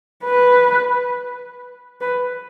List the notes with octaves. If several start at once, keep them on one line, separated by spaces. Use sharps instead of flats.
B4
B4